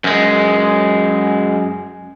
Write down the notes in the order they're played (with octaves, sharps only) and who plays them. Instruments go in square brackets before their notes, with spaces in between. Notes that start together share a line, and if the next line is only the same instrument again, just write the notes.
[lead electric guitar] F#2 G#3